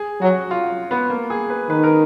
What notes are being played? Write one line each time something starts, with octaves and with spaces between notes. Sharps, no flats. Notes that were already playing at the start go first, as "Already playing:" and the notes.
Already playing: G#4
F#3 F#4
F4
B3
A#3
G#4
B4
D#3 B4
A#4